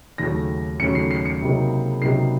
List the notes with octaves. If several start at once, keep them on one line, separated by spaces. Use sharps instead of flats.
D#2 C#3 F#3 A3 C#4 A#6
D#2 C#3 F#3 A3 C#4 C#7
C7
C7
C#7
C#2 C3 F#3 A#3 D#4
C#2 C3 F#3 A#3 D#4 C7